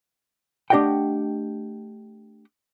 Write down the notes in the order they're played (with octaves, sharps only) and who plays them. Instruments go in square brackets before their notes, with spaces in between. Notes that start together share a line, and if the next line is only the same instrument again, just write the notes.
[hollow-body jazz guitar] A3 D4 G4 D#5 F#5 G5